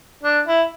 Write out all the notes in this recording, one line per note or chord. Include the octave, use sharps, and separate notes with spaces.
D4
E4